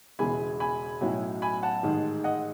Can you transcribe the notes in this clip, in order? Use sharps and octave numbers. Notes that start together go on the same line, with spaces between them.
E1 E2 C#3 E3 G#3 G#5 B5
G#5 B5
B1 A2 F#3 C#4 E4
G#5 B5
F#5 A5
A1 G#2 D#3 G#3
D#5 F#5